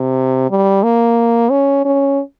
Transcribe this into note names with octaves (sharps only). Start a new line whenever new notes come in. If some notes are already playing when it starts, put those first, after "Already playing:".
Already playing: C3
G3
A#3
C#4
C#4